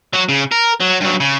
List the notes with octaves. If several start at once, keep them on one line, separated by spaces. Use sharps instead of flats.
F#3 F#4
C#3
A#4
F#3
G2 F#3
C#3